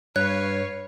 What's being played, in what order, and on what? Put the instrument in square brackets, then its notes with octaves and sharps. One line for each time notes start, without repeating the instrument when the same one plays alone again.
[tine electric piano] G2 [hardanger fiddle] B4 F5 [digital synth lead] C#5 [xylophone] F#6